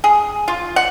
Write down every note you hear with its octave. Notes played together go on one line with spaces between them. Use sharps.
G#4
F4
F#5